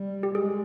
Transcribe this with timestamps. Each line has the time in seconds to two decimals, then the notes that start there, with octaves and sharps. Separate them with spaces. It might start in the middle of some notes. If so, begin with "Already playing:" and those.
Already playing: G3
0.23 G4
0.34 G#3 G#4